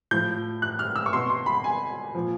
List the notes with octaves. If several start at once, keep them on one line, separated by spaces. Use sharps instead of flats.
A2 F3 G6
F#6
F6
E6
C#6
B2 C6
C6
B5
G#5
A#2 F3